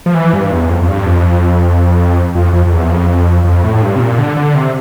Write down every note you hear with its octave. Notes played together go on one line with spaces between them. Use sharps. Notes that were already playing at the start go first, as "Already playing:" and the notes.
F3
E3
G2
E2
F2
F2
G2
F2
F2
F2
F2
E2
F2
F2
A2
G2
C3
A#2
D3
D3
C3